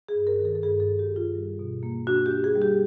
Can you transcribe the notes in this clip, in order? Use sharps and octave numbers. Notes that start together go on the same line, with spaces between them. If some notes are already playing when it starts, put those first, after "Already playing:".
G#4
G2
A#4
D#3
A4
A4
G2 G#4
A4
G2
G4
G2
F4
G3
B2
A#3
D4 F#4
G4
D4
G#4
G3
G4